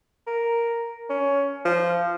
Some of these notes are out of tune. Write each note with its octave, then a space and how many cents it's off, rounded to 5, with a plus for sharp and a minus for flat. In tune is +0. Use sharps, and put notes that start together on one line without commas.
A#4 +0
C#4 +15
F3 -15